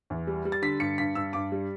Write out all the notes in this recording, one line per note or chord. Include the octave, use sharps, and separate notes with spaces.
E2
G3
G3
A6
D3 B6
G2 C#7
G2 B6
G2 E6
G2 D6
G3